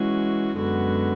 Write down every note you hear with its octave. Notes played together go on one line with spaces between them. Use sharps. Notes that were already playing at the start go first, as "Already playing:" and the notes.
Already playing: E3 G#3 C#4 F#4
F#2 D3 G#3 B3 F#4